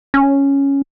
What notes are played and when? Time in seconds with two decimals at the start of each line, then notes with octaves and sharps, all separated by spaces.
0.14 C#4